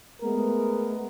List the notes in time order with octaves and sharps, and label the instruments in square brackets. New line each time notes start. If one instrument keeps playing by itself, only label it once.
[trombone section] G#3 A3 B3 A#4